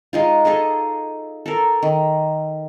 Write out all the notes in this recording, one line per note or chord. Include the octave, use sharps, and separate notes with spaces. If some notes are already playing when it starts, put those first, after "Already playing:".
G#3 D#4 F4
D#4 G#4 A4 D#5
A4 A#4
D#3